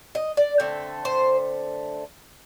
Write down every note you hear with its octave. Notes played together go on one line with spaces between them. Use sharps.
D#5
D5
D3 A3 C4
C5